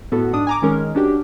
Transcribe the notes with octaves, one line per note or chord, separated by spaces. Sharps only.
A2 B3 F#4 A4
G#2 D4 D#6
G#5 A#5 D6
D#3 G#3 C#4 A#4
C#4 D4 F#4 G4